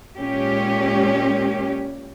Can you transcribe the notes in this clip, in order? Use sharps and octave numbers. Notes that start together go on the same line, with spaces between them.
A#2 G#3 C#4 G4